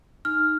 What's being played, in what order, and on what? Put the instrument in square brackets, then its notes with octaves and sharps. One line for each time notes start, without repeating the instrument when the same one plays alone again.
[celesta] D#4 F6